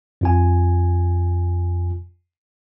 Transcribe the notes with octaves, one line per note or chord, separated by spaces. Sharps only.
F2 F4 G#5